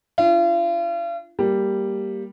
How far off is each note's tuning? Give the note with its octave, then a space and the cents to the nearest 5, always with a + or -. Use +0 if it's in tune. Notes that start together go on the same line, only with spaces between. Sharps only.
D4 +0 F4 -40
G3 +0 A#3 +0